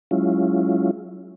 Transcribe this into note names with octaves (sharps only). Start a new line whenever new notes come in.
F#3 G#3 C#4 E4 F4